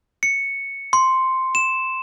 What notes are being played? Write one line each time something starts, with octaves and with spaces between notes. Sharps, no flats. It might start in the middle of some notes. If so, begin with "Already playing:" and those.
C#7
C6
E7